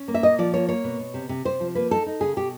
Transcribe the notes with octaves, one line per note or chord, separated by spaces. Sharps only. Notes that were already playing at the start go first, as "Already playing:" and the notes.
Already playing: C#4
A#3
E5
A#2 D#5
F3 D5
A#3 C#5
A#3 C#5
B2
B2
C3
C3
C3 C5
F3
A#3 B4
D#4 A4
D#4
C#3 G#4
B2 G4